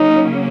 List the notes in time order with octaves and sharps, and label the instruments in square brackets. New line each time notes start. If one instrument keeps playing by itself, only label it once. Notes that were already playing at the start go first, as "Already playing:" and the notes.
Already playing: [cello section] C#3 F#3 A#3 C#4 [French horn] D#4